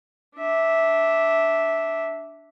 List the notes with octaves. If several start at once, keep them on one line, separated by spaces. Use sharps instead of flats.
D4 E5